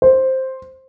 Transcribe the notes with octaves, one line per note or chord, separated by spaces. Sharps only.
C5